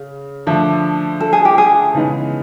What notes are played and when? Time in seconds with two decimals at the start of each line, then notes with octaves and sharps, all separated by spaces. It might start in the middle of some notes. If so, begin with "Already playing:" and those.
Already playing: C#3
0.47 D3 F3 A3 D4
1.20 A4
1.33 G#4
1.45 G4
1.58 G#4
1.94 C#3 E3 G#3 B3 D#4